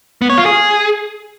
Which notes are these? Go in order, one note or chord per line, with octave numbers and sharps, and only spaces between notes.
B3
C#5
F4
G#4